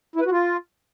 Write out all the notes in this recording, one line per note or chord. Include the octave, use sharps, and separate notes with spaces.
E4
B4
F#4
F4